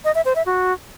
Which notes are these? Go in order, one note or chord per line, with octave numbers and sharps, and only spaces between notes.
D#5
E5
C5
E5
F#4